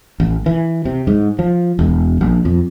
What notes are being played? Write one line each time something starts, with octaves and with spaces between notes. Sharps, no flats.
A1
E3
C3
G#2
F3
E1
A#1
F2